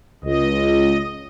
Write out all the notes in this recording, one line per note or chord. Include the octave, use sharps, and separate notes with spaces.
C#2 D#5